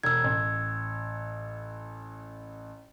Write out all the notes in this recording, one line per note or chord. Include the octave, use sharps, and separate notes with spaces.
E1 E6 G#6
A1